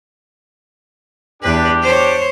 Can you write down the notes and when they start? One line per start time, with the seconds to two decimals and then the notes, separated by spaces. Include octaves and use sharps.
1.43 E2 D4 G4 B4
1.82 C5 C#5